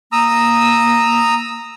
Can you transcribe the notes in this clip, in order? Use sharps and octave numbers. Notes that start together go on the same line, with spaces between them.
A#3 A#5 D#6 E6